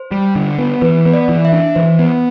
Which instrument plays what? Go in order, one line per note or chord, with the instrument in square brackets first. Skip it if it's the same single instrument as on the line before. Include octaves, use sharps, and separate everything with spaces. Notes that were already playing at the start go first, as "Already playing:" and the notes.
Already playing: [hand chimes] C5
[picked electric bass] G3
D3
B3
[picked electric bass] E3 [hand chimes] B4
[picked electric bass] B3
[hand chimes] D5
[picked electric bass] E3
[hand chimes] E5
[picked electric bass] D4
[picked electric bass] E3 [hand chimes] C5
[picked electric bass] B3